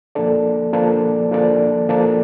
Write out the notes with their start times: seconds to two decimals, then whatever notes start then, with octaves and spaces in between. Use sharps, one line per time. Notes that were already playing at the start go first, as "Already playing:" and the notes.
0.15 F3 A#3 D4 A4 D5
0.73 F3 A#3 D4 A4 D5
1.32 F3 A#3 D4 A4 D5
1.89 F3 A#3 D4 A4 D5